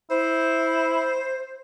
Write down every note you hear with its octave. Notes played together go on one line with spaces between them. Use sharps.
E4 C5